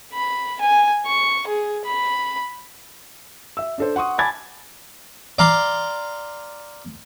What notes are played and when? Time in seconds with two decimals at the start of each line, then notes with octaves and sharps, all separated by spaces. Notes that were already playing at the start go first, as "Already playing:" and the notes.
0.14 B5
0.61 G#5
1.06 C#6
1.47 G#4
1.85 B5
3.57 E5 E6
3.78 D4 A4 C5
3.96 F#5 C6 C#6 D#6
4.18 G#5 A5 B5 D6 G#6 A6
5.39 D5 F5 A#5 C6